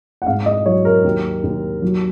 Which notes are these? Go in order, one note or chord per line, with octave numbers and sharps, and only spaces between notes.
F#5
G#2 F5
D#5
F#3 C#5
A#4
D#2
D#2
F#3